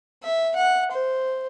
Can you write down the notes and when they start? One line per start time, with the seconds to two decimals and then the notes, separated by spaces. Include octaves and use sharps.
0.23 E5
0.56 F#5
0.92 C5